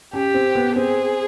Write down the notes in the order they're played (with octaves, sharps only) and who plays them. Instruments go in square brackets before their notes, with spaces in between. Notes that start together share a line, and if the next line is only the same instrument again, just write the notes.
[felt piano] C#4 [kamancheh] G4
[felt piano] C4
B3
[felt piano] C4 [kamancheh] G#4